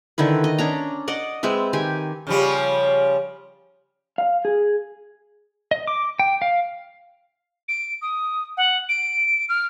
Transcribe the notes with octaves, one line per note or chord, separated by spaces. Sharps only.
D3 D#3 E4 B4
D#5
C#4 D4 A#5
D5 D#5 F#5
G#3 C4 B4 E5
D#3 G4 G#5
C#3 F3 G3
F5
G#4
D#5
D6
G5
F5
D7
D#6
F#5
D7
F6